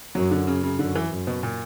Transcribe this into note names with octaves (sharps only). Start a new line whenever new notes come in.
F#2 F#3
D3
C#3
C#3
F#2 D3
E3
F#2
B2
A#2